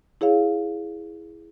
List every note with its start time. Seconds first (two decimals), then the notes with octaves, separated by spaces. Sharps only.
0.21 E4 G#4 C#5 F5